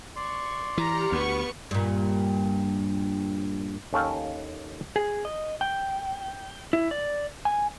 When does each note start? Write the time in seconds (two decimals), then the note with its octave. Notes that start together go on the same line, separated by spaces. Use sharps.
0.16 D5 C6 C#6
0.78 E3 G4 A#5 F6 C#7
1.12 D2 B3 C#6
1.71 G2 A#2
3.93 D#2 C#4 A4 F5 G5
4.96 G#4
5.25 D#5
5.61 G5
6.73 E4
6.91 D5
7.45 G#5